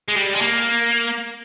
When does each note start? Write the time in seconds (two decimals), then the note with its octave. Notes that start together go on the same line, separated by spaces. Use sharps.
0.08 G#3
0.16 G3
0.35 G#3
0.41 A#3